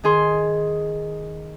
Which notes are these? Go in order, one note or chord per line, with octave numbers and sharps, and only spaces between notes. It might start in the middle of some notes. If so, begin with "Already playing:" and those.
D#3 G#4 C6